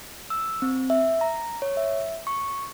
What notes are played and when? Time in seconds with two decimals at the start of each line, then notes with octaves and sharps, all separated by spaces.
0.30 E6
0.62 C4
0.90 E5
1.21 A#5
1.62 C#5
1.77 E5
2.27 C#6